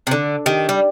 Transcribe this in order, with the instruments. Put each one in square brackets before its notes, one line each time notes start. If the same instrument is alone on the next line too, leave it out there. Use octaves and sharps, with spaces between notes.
[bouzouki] C3
[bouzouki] D3 [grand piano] D4
[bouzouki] D#3 [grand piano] G4
[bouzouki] G3